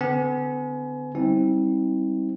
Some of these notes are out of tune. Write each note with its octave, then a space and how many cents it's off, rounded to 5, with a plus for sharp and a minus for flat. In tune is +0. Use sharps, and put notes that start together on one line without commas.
D3 -10 B3 +40 G#5 +30
G3 -10 C4 +15 E4 -40